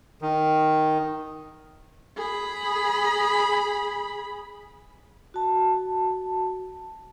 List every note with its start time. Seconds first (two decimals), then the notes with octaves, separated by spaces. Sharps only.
0.22 D#3
2.17 G#4 B5
5.34 F#4 A5